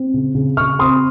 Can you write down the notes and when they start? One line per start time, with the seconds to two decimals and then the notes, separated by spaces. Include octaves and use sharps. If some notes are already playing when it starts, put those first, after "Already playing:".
Already playing: C4
0.14 C#3
0.35 C#3
0.57 C#3 C#6 F6
0.79 C4 C6 D#6